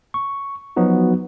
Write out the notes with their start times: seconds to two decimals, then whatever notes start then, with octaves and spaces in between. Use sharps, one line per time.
0.14 C#6
0.76 F3 F#3 B3 D#4 F#4